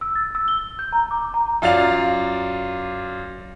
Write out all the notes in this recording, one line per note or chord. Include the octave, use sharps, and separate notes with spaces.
E6
A6
E6
G7
G6
A#5
D6
A#5
F#2 F4 D5 F5 F7